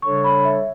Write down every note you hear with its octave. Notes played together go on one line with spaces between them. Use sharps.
C#3 G3 D4 A4 C#5 C#6
B5
E5